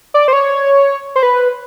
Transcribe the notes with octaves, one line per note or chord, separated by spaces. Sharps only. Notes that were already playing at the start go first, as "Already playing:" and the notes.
D5
C5
C#5
C5
B4